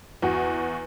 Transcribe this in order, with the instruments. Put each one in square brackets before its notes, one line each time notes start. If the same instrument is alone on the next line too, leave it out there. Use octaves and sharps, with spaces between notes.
[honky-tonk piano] E2 F#4